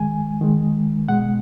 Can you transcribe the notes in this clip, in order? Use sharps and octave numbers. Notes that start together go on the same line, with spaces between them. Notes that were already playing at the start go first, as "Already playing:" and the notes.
Already playing: D#3 G#3 G#5
D#3 G#3
B2 G#3 F#5